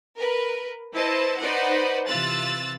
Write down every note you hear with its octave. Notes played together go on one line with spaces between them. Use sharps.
A#4 B4
E4 B4 C5 D#5 A5
D#4 B4 C5 D5 D#5 F#5
C3 E3 F4 E6 F#6 A6